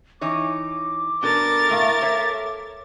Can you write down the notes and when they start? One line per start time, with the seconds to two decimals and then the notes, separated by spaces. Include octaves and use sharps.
0.21 E3 D#4 C#5 D6
1.23 B2 D4 A4 A#4 A6
1.70 A2 A3 F5
2.01 A4 C#5 E5